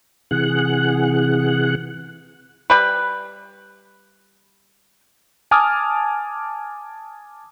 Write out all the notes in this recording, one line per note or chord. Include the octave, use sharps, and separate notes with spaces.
C3 E3 G#4 F#5 F#6
G3 B4
G#5 A5 D6 D#6 F6